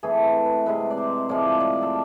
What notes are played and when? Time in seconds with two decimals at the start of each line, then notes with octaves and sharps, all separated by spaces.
0.03 E3 A3 C4 G#4
0.24 A4
0.45 B4
0.66 C3 G#3 C4 B4
0.90 D5
0.97 C5
1.29 A2 F3 G#3 D5
1.60 D5
1.82 A4